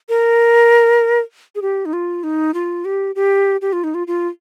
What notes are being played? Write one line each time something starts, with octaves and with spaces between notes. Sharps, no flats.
A#4
G#4
G4
D#4
F4
D#4
F4
G4
G4
G4
F4
D#4
F4
F4